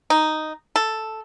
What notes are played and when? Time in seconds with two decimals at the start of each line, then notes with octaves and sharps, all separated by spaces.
0.10 D#4
0.76 A4